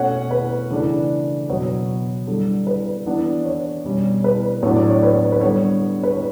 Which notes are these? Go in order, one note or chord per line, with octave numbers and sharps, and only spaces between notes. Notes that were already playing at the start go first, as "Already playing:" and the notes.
Already playing: B2 A3 C#4 F#5
B4
C#3 E3 A3 D4
B2 F#3 B3 C#5
D3 G3 D4
B4
E3 B3 D4
C#5
B2 G3 C#4
B4
A2 F#3 B3 D4 C#5
D5
C#5
B4
C#5
B4
D3 G3 B3 D4 C#5
B4
C#5